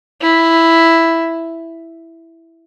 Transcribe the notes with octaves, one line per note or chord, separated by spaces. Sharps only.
E4